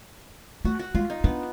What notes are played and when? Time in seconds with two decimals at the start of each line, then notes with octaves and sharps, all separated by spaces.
0.65 A3 F#4
0.79 F#4
0.95 G#3 F4
1.10 D#4
1.24 B3 D4